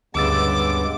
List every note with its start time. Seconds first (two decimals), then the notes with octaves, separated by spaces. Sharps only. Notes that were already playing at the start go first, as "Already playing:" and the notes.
0.15 D2 G2 C#3 G#3 B3 D6 E6 A6